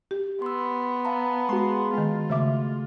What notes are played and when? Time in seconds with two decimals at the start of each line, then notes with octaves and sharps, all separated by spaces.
0.11 G4
0.42 B3 C6 E6
1.05 F5 A5 A#5
1.49 G#3 F#4 G#4 C6
1.94 D#3 G#3 F4
2.30 C#3 A3 E5 D6